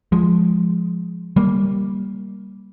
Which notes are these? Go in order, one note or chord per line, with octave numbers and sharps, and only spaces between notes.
F3 G#3
G3 A#3